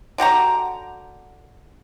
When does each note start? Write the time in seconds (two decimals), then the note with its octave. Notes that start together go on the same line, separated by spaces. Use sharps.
0.18 D3 F#4 G4 A#5